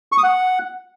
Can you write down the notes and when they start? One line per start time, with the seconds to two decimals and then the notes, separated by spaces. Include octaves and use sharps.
0.12 C#6
0.18 D#6
0.23 F#5